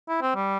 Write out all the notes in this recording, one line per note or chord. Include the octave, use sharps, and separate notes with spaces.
E4
C4
G3